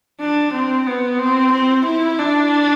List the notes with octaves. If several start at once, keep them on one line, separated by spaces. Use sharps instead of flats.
D4
C4
B3
C4
C4
E4
D4